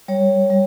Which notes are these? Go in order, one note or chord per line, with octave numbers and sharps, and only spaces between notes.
G3 C#5
G3